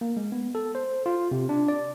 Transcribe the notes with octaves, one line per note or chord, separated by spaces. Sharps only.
A#3
G#3
B3
A4
C5
F4
C3
D4
D5